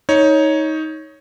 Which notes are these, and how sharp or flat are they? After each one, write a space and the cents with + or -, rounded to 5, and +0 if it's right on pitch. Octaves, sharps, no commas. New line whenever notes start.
D#4 +15 C#5 +0